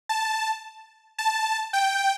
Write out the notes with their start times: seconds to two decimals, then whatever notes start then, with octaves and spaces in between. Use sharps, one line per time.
0.09 A5
1.18 A5
1.73 G5